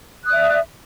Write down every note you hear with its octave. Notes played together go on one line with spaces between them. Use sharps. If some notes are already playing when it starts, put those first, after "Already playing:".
D5 E5 D#6 F#6